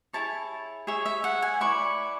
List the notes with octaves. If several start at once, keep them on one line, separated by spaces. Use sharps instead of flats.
E4 G#4 C#5 A5
G#4 C#5 E5
E5
F#5
G#5
E4 B4 D5 C#6